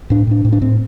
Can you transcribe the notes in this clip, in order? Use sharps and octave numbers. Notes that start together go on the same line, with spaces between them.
A2 D4
A2 D4
A2
D4
A2 C4